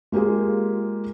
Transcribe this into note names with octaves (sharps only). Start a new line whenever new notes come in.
G#3 A#3 F4 G4 G#4